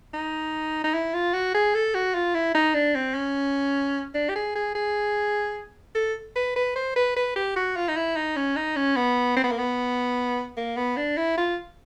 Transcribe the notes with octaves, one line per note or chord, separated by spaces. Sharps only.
D#4
D#4
E4
F4
F#4
G#4
A4
F#4
F4
E4
D#4
D4
C4
C#4
D4
G4
G#4
G#4
G#4
A4
B4
B4
C5
B4
B4
G4
F#4
F4
D#4
E4
D#4
C#4
D#4
C#4
B3
C4
B3
A#3
B3
A#3
B3
D4
E4
F4